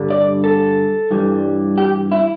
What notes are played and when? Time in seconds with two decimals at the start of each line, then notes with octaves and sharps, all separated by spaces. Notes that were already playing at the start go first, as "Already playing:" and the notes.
Already playing: G2 D3 G3
0.10 D5
0.44 A4
1.11 G2 E3 G3
1.78 G4
2.12 E4